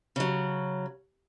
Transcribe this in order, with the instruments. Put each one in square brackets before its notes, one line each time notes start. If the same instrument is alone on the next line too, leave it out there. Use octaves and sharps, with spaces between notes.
[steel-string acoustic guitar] C#3 F#3